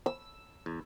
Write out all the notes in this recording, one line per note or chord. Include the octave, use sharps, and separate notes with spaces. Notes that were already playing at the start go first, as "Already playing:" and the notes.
E6
E2